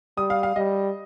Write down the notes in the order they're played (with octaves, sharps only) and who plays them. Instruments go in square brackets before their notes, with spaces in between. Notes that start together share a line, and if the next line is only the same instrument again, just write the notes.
[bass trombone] G3 [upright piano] D#6
[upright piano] F5
F5
[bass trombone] G3 [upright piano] D#5